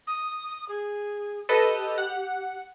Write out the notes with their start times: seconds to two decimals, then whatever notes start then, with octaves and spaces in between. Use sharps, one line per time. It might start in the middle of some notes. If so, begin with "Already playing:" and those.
0.07 D#6
0.69 G#4
1.49 G4 A4 B4 D#5
1.98 F#5